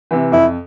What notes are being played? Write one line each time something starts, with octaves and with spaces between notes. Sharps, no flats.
C3 E3
F2 E4